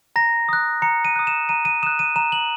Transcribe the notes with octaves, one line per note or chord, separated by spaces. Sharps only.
A#5 A#6
D#6 F#6
A#5 C#7
D#7
D#6 F#6
E7
A#5 D#7
D#7
D#6 F#6 E7
D#7
A#5 E7
F#7